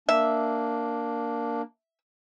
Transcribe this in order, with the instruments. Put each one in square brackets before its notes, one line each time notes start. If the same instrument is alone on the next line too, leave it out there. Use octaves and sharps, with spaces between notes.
[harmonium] A#3 D4 [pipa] E5